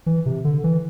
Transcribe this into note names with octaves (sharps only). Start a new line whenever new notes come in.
E3
C3
D3
E3